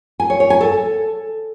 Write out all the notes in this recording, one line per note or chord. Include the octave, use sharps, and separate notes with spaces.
G#5
C#5
C#5
G#5
A4